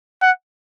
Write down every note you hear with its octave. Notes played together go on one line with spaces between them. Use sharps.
F#5